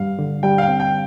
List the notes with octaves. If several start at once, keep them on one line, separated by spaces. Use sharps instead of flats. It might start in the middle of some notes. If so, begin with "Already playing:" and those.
Already playing: G2 G3 F5
D3
G3 G5
F5
G5
C4
G5